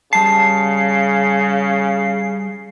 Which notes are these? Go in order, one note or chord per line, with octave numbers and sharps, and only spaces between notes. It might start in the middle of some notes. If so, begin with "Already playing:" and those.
C#3 G3 A5 C7